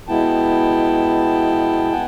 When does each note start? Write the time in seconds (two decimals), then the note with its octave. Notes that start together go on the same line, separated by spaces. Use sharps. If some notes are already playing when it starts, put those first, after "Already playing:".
0.08 B2 G#3 B3 E4 G5 A5
1.92 B3 F#5 G#5